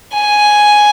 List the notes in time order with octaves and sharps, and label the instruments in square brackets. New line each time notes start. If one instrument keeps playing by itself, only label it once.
[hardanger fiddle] G#5